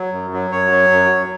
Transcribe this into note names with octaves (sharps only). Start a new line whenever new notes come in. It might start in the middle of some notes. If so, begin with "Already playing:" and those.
Already playing: F#3
F#2
F#3
F#2 C#5
F#3
F#2
F#3